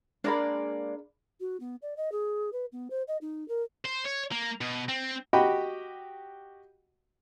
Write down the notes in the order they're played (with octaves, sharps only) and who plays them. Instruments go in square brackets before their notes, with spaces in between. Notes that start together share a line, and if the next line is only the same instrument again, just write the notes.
[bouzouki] G#3 A#3 D5 [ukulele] D4 A#4 B5
[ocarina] F#4
B3
D5
D#5
G#4
B4
B3
C5
D#5
D#4
A#4
[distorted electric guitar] C5
C#5
A#3
B2
C4
[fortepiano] F#4 G4 D#5 F#5 G5 B5